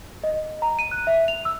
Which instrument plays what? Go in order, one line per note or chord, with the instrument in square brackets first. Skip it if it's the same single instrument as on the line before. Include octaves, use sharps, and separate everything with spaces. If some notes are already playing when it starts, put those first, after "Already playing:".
[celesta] D#5
A#5
D#7
F#6
E5
F7
E6